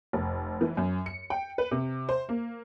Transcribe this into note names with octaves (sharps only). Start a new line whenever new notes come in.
F1
E3
F#2
C#7
G5
B4
C3
C5
A#3